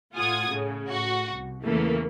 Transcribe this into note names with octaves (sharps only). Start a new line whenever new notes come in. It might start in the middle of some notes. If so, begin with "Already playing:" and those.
A2 F4 F#5 G#5 D#6 G#6
A2 C#3
A2 F#4
C2
E2 C#3 E3 A3 A#3